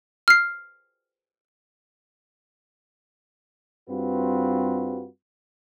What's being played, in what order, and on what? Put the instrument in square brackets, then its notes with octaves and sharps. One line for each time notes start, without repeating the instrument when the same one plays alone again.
[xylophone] F6 C7
[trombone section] G2 G3 C4 F4 F#4 B4